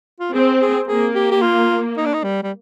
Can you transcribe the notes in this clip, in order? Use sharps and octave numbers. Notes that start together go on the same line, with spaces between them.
F4
C4 G#4
G#4
A#3 G#4
G4
G4
F4
D#4
D4
D#4
G3
G3